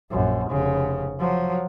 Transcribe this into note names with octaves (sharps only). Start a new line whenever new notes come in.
A#1 F#2
F1 C#3
F3 F#3